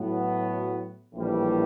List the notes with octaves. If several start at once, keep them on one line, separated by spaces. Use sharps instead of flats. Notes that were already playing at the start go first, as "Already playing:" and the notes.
Already playing: A2 F#3 B3
A#1 A2 E3 G3